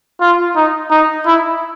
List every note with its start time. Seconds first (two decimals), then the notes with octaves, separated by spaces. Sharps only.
0.20 F4
0.56 D#4
0.91 D#4
1.26 E4